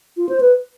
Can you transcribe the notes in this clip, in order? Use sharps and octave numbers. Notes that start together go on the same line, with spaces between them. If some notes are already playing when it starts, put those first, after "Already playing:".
F4
C5
B4